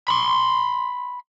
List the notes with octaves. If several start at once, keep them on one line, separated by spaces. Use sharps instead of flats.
B5 C6